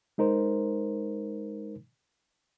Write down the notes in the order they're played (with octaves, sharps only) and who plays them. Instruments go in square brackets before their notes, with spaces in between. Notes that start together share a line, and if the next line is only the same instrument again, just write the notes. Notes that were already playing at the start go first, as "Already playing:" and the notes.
[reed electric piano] G#3 D#4 A#4 C5